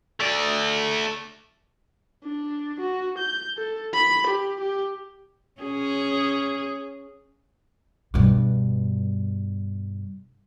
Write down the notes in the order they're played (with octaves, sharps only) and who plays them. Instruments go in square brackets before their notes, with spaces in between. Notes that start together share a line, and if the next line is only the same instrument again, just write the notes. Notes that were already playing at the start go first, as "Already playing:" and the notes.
[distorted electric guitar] A3 D5
[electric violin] D4
F#4
G6
A4
B5
G4
G4
[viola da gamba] C#4 G#4
[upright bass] G2 B2